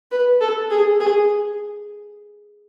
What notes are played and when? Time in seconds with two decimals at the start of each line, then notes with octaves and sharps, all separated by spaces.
0.11 B4
0.41 A4
0.71 G#4
1.00 G#4